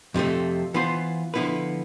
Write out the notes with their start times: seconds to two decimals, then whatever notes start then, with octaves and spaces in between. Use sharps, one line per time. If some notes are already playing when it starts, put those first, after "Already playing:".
0.14 F2 C3 F3 A3
0.74 E3 B3 F4 C5
1.34 D3 F3 B3 E4 B4